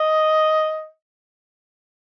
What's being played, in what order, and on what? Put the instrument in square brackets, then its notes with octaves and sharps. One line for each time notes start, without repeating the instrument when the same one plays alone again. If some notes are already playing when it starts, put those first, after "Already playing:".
Already playing: [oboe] D#5